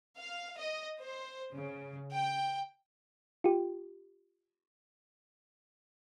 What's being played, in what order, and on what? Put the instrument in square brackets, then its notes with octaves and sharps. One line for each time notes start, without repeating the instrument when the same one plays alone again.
[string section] F5
D#5
C5
C#3
G5
[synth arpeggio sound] F4 G4